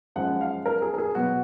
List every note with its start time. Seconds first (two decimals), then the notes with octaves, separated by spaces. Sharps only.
0.16 F#2 F3 G#3 F#5
0.41 F5
0.66 A#4
0.82 G#4
0.94 A#4
0.98 G#4
1.15 B2 F#3 B3 F#4